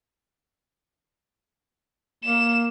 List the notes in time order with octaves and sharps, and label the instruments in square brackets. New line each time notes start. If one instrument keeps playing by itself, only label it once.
[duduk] A#3 [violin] E7